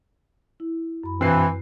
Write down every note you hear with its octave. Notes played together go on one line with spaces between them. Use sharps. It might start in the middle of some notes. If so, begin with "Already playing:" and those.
E4
F#2 B5
G2 B2 E3 C4 B4 C7